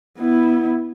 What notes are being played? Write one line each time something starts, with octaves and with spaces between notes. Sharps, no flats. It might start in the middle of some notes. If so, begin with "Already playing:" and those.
B3 E4